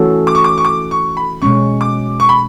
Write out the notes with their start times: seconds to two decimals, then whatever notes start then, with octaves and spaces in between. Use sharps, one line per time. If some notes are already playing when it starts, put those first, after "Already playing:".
Already playing: E3 A3 C#4 F#4 A4
0.27 D6
0.35 C#6
0.44 D6
0.58 C#6
0.65 D6
0.91 C#6
1.17 B5
1.42 B2 G#3 C#4 C#6
1.81 D6
2.20 C#6
2.29 B5